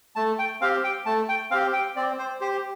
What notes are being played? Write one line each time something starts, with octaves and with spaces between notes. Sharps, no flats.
A3 A5
G5
C4 G4 F5
G5
A3 A5
G5
C4 G4 F5
G5
C4 D5
C5
G4 C5